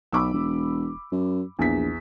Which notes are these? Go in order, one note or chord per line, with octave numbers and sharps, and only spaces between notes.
B1 B5 D6 E6
E1
F#2
A#1 E2 B6